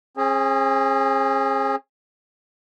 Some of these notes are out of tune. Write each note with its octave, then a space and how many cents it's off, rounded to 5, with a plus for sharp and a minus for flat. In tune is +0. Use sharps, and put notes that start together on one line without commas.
C#4 -45 G#4 +0